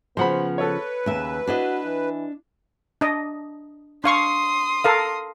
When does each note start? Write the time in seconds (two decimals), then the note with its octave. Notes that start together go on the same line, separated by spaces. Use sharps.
0.17 C#3 F3 B3 C5 F#5 B5
0.58 A4 B4 C#5
1.06 D#2 C#3 E5
1.47 D4 E4 F#4 D#5
1.85 E3
3.01 D4 D#5
4.04 D4 F5 C6 C#6 D#6
4.84 A4 A#4 F5